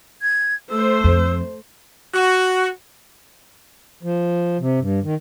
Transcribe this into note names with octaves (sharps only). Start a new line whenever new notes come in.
G#6
A3 C5 E6
F2
F#4
F3
C3
G2
D#3